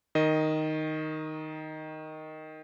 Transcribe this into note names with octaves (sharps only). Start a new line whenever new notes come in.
D#3 D#5